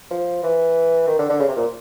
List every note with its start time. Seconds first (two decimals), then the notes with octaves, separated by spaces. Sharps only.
0.11 F3
0.43 E3
1.07 D#3
1.19 D3
1.29 D3
1.40 C#3
1.48 C3
1.56 A#2